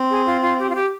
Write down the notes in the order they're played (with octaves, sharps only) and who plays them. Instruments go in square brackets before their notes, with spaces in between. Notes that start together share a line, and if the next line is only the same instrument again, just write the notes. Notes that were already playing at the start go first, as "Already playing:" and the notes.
Already playing: [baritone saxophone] C4
[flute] G#4
F4
F4
G4
F4
G4